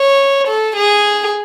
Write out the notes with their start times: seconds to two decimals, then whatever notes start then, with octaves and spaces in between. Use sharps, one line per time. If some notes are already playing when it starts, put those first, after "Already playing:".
Already playing: C#5
0.48 A4
0.76 G#4